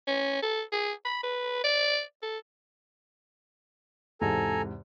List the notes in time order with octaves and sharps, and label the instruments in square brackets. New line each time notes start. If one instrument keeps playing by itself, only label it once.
[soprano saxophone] C#4
A4
G#4
B5
B4
D5
A4
[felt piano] E2 G#2 C3 [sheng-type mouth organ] A4 G#5 A#5